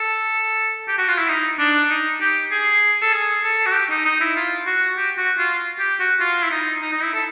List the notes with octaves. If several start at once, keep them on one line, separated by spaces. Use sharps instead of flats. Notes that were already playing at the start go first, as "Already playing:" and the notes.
Already playing: A4
G4
F#4
F4
E4
D#4
D4
D#4
G4
G#4
A4
G#4
A4
F#4
G4
D#4
D#4
E4
F4
F#4
G4
F#4
F4
G4
F#4
F4
E4
D#4
D#4
D#4
E4
A4